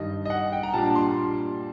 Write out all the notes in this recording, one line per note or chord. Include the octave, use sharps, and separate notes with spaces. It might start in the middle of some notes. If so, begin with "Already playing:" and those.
Already playing: G2 D#3 G3 D#5
D#5
F#5
G5
A#5
A#2 G3 D4 A5
C6